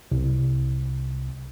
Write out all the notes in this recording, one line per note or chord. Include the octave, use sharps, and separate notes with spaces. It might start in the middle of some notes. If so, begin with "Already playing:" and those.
C2